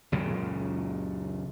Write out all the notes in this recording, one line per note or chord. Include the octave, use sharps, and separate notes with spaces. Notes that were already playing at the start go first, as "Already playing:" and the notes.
C#2 F#2 A#2 C#3